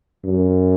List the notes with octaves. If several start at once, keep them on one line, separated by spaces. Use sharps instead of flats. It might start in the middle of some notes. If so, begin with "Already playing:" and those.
F#2